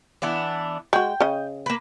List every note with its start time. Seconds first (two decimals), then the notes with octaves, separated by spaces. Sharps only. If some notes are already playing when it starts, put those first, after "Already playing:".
0.22 E3 B3 D4
0.93 G#3 F#4 G5
1.20 C#3 D#5
1.66 A#3 B4